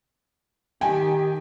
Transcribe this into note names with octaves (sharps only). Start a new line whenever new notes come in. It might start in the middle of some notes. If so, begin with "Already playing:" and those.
D#3 G4 G5 G#5